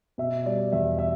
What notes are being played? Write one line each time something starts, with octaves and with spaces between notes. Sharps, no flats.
B2 E5
G3 D5
E2 E5
E5